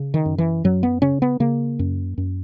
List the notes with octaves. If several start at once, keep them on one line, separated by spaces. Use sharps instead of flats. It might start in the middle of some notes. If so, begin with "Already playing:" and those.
Already playing: C#3
D#3
F#2
E3
F#2 F#3
B3
C#3 C#4
B3
C#3 A#3
F#2
F#2